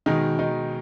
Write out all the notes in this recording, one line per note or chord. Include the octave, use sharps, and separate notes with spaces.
B2 D#3 G#3 D#4
D#3 D#4